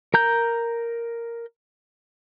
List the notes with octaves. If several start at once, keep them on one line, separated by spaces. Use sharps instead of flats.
A#4 A#5 G6